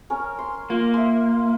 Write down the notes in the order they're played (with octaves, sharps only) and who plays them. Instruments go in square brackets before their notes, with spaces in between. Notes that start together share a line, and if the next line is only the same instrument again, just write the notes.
[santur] C#4 A#4
C6
[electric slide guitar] A#3 [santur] F4
[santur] E5 C6